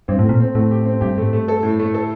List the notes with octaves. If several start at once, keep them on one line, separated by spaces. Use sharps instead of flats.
G2 C4
A2
A#2 A3
C4
A2 A3
G4
C4
G2 G4
A2 A3
G2 A3
A4
A2
A3
A4